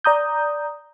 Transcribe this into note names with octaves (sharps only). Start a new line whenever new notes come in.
D5 A#5 D#6 G6